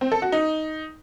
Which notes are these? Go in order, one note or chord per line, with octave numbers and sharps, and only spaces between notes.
C4
A4
F#4
D#4